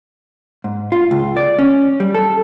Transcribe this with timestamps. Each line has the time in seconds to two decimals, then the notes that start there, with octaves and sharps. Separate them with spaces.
0.64 G#2
0.92 F4
1.11 C#2
1.37 D5
1.59 C#4
2.00 G3
2.14 A4